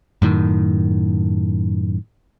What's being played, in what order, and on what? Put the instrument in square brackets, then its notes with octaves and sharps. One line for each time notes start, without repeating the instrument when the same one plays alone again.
[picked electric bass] F#2 A2 D#3